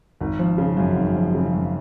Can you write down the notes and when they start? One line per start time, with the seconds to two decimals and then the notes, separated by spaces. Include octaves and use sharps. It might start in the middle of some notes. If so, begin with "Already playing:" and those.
0.21 G#1
0.39 F3
0.58 C#3
0.77 F#2
0.96 G#1
1.16 F3
1.35 C#3
1.54 F#2